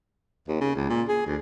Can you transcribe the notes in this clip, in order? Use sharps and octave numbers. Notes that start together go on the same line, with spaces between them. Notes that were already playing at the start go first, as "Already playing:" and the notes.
D#2
C#3
C#2
A#2
G#4
D2